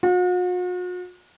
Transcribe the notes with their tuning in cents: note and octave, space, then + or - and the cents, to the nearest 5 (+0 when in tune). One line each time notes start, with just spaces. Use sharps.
F#4 -45